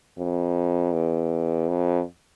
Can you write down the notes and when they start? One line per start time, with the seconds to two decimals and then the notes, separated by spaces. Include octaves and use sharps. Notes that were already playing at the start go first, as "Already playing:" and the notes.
0.18 F2
0.93 E2
1.68 F2